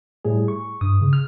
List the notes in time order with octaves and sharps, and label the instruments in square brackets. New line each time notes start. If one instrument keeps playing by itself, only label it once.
[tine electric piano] A2 G3 G#4
C#6
[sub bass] G2 [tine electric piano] D#6
[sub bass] C#3
[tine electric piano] F6